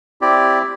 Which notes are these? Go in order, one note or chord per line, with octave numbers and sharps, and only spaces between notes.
C4 E4 G4 D5